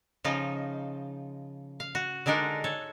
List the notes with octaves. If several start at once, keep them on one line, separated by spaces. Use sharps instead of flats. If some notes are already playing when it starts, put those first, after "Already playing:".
C#3 F3 D#4 F4
F5
F#4
D3 G#3 D4 D#4 A#4
A4 C#5